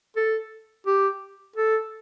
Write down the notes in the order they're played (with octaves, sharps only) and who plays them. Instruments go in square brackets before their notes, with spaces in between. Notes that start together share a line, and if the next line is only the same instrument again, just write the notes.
[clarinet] A4
G4
A4